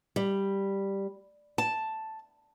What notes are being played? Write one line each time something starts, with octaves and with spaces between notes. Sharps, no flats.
G3
A5